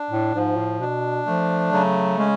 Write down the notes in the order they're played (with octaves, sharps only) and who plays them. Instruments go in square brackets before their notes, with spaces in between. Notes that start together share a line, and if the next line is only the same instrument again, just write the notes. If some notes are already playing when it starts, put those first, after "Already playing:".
Already playing: [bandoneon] D4
[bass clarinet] A2
[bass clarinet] G#2 [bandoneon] F3
[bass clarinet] A2
[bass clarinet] B2 [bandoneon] D4
[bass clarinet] F3 [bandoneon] A3
[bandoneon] C#3 [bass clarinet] F#3
[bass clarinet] G#3 [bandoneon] C#4